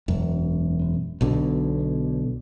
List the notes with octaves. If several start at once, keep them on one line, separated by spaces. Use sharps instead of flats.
E1 F#2
B1 B2 D3